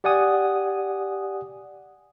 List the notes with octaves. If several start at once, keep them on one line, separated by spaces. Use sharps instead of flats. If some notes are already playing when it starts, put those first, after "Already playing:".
G4 D5 F#5 G#5 D#6